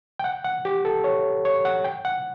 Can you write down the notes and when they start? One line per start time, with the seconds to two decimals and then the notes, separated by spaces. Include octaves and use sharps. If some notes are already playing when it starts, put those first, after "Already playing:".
0.19 G5
0.24 F#5
0.45 F#5
0.65 G4
0.85 A4
1.04 C#5
1.45 C#5
1.65 F#5
1.84 G5
2.05 F#5